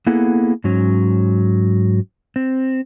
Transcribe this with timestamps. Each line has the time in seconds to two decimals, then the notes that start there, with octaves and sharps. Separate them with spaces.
0.07 A#3 B3 E4 G#4 A4 F#5
0.64 G#2 F#3 C#4
2.36 C4